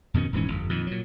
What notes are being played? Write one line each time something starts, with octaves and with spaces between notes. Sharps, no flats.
F2 B2 D#3 C#4
D#1 G#2 E3 C#4
G1 F2
F2 A#2 D#3
A#2 F#3